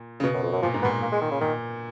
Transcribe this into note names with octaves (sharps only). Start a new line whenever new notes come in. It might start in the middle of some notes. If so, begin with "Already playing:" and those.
Already playing: A#2
C#3
B2
F#2
F2
F#2
A#2 F3
G#2
A#2 B3
A#3
G#3
D#3
C#3
A#2 D#3